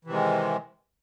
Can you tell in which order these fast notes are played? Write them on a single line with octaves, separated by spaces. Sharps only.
E3 C3 D#3 G#3